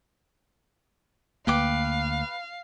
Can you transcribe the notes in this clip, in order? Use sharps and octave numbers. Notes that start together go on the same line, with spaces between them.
D2 A#3 B4 F5 G5 D6